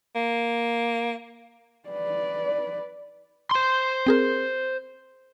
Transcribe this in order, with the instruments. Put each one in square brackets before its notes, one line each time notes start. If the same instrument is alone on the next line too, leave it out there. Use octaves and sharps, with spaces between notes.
[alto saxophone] A#3
[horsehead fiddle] B4 D5
[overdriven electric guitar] C5 C6
[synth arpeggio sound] C4 G#4 A#4